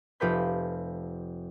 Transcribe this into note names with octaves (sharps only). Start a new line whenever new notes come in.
F1 F4 G4 B4 B5 G6